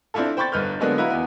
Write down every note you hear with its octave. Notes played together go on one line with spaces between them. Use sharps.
C4 D4 E4 F4 A4
C5 G5 B5 C#6 G6 A6
G1 D#4 B4 F6 G6
D3 F#3 G#3 A#3 B3 D4
D#4 E4 F#4 B4 F5 A#5
E2 B3